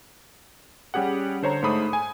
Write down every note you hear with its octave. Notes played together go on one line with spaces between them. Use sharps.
G3 C#4 G4 G#4 F#5
D3 C5 C#5 A#5
G#2 A3 C5 B5 D#6
G#5